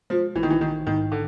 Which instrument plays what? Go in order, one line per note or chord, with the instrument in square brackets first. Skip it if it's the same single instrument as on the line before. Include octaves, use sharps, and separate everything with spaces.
[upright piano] F3 [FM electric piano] G#3
[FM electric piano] A#1 [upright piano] E3
[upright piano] D#3
E3
[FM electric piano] A#1 [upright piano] D#3
[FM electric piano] G#2 [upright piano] D#3
[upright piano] D3